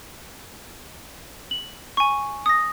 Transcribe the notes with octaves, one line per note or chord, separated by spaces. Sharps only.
F#7
G#5 C#6
D#6 A#6